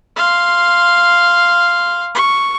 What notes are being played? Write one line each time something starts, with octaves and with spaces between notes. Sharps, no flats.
F5 C6
C#6